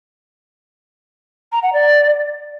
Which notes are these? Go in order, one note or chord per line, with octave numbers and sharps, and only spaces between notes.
A#5
F#5
D5